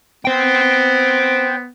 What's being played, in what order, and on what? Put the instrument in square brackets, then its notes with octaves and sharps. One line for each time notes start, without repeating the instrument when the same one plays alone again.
[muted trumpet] B3 [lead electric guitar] C5 G5